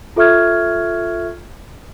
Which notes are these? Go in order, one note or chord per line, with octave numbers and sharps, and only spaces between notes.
F4 A4 E5 C#6 F6 G#6